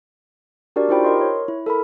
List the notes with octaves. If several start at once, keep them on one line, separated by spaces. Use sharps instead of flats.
D4 F#4 G4 A#4 D5
D#4 F4 G4 C5 G5 B5
A#4 D#5 C6
C#5
E4
A4 A#4 B5